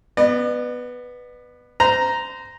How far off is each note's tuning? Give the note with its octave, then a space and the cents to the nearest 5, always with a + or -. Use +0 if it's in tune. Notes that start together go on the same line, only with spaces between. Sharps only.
B3 +0 D5 +45
C5 -30 A#5 +0